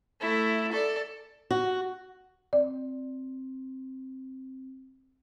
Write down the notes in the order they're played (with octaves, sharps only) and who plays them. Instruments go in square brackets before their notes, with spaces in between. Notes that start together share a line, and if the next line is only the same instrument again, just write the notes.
[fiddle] A3 E4
A4 D5
[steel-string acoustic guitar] F#4
[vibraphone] C4 [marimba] D5